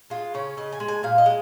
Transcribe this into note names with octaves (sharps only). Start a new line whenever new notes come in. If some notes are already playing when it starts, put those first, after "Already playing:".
G#3 F4
C#3 C#4
C#3 D#5
G#5
G#3
G#5
A#2 F5
D#5
G#3